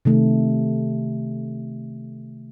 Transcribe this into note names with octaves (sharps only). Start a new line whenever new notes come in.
C3 D#3 A3